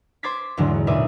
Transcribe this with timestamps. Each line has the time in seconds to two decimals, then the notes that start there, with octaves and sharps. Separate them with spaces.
0.23 C5 C6 D6 G#6 A6 B6
0.57 E2 G#2 D3 F#3
0.87 B1 A#2 B4 D5 E5 D#6